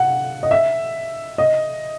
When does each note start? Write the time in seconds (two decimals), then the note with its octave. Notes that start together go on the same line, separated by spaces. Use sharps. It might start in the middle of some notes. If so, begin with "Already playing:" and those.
Already playing: F#5
0.43 D#5
0.51 E5
1.38 D#5